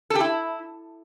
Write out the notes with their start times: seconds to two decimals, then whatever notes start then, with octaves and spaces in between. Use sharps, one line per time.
0.10 A4
0.15 G4
0.20 E4